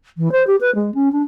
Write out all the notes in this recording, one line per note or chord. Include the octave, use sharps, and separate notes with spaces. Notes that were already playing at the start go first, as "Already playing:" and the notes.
E3
C5
G4
B4
G#3
C#4
D4